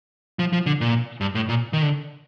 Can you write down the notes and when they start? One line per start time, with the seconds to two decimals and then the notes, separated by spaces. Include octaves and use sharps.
0.39 F3
0.53 F3
0.66 D3
0.81 A#2
1.21 G2
1.35 A2
1.49 A#2
1.73 D#3
1.83 D3